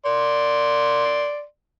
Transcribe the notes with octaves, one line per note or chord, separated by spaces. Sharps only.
D5 C6